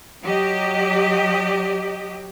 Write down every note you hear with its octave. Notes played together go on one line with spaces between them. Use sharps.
F#3 G4 D#5